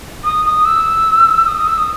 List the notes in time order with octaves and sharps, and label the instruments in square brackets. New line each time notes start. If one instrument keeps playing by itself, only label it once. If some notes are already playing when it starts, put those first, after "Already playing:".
[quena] D#6
D#6
E6
D#6
D#6
E6
D#6